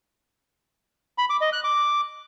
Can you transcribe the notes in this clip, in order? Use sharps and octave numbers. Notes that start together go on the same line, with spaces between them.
B5
D6
D#5
F#6
D6